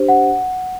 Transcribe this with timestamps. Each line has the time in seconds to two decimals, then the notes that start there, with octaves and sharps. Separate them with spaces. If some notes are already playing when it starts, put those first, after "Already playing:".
Already playing: D4 G4 C5
0.09 F#5